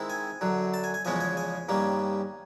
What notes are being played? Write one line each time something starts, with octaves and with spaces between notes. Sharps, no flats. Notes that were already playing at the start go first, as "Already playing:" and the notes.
Already playing: D#3 G#3 C4 E4
G#5
F#2 D3 F#3
A5
G#5
G#5
E2 C#3 F3 G#3 C#4 G#5
G#5
G#5
G2 D#3 G3 A#3 C#4